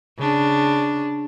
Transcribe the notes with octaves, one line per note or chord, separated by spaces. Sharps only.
C#3 D4